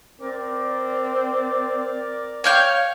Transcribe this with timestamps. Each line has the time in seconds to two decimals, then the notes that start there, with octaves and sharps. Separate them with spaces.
0.21 C4 A#4 D5
2.44 C#5 F5 G5 G6